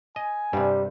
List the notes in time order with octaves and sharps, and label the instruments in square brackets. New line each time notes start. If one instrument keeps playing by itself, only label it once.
[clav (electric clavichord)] D#5 [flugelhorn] G#5
[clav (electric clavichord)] G2 C3 [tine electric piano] G3 [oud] C4 D4